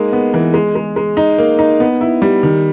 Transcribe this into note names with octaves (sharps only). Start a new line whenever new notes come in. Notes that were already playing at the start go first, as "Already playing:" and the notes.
Already playing: G#3 A#3 D#4
B3
E3
G#3
G#3
G#3
D#4
A#3
D#4
B3
E4
G3
D#3